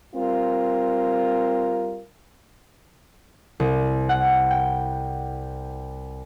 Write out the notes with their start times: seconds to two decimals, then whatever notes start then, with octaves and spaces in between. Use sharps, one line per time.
0.16 G3 C4 F4 A#4
3.60 C2
4.09 F#5
4.51 G5